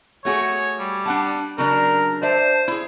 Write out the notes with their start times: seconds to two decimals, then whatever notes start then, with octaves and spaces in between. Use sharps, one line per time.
0.25 A3 F#4 G#4 C#5
0.80 G3
1.06 D4 F#5 A5
1.58 C#3 F#3 D4 A#4
2.23 C5 D5 E5 A5
2.68 E4 G#4